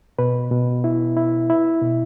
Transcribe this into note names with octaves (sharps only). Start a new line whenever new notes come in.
B2 B4
B2
E4
E4
E4
B2